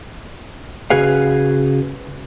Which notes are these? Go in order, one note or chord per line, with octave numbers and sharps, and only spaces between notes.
C#3 F#4 G#4 B4 F5